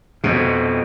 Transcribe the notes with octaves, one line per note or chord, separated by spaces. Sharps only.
F2 B2